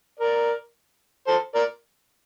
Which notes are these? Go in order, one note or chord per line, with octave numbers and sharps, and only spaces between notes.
A#4 D5
A4 C5
A#4 D5